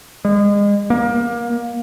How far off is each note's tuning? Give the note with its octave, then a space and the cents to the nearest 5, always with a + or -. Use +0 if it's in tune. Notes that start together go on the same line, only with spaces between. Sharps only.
G#3 -30
A#3 +25